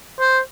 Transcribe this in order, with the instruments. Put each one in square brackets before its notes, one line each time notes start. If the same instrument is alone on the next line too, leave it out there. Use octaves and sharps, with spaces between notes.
[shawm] C5